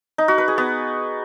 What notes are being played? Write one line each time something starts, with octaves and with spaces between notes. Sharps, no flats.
D#4
F#4
B4
G#4
B3